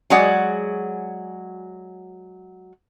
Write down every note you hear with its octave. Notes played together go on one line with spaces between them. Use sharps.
F#3 G#3 F#4 G#4 D5 F#5